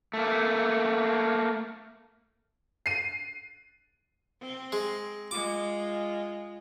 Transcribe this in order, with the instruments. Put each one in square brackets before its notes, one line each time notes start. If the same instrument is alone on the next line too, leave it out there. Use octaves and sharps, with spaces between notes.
[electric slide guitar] A3 A#3
[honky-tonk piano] C7 D#7
[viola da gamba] C4
[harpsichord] G#3
[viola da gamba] G#3 F4 [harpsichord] D6